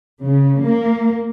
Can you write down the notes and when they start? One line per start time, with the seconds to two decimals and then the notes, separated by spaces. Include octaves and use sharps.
0.21 C#3
0.59 A#3